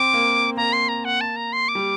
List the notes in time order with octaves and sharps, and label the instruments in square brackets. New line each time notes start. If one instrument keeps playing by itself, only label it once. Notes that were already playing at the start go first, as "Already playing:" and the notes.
Already playing: [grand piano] C4 [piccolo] D6
[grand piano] A#3
[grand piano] A#3 [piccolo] A#5
[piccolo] C6
A#5
F#5
A5
A#5
C6
D6
[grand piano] G3